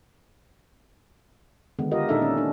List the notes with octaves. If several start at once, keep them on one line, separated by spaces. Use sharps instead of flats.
D3 D#3 G#3 B3
F4 G4 A#4 D#5
A#2 D4 D#4 A4 E5
C#4
D4